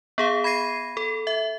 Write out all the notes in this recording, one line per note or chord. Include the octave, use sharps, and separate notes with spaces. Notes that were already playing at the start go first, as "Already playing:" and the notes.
B3 G#4 F5
B5 G#6 A#6 C7 D#7
A4
E5